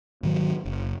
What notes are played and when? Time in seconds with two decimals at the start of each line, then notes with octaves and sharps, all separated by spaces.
0.23 G#2 D#3 F#3
0.65 F#1